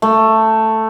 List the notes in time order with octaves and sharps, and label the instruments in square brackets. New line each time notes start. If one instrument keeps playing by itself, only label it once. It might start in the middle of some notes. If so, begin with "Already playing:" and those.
[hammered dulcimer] A3